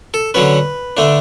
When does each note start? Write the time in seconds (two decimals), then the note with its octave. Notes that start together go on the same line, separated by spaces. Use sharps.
0.14 A4
0.34 D3 F#3 C#4 B4
0.97 D3 A3 D4